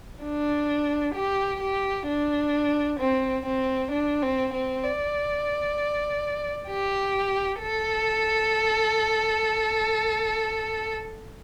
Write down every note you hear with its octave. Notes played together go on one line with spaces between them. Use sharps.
D4
G4
G4
D4
C4
C4
D4
C4
C4
D5
G4
A4